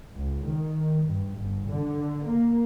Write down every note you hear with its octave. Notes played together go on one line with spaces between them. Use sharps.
C#2
D#3
G2
G1
D3
A#3